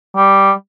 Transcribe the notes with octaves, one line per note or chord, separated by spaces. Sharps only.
G3